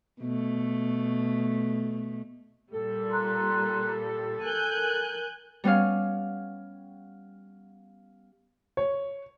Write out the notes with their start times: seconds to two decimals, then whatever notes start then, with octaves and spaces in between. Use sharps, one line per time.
0.21 B2 A3
2.72 A#2 G3 A4
3.12 A#5 C6 F#6
4.44 A#4 G#5 F#6 G6
5.64 G3 B3 C#4 F5
8.77 C#5